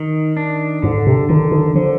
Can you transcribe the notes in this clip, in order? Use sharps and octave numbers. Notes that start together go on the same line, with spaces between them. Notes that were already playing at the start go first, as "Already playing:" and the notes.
Already playing: D#3
D4
G#2 D3
C3
D3 D#3
D#3
D3 F3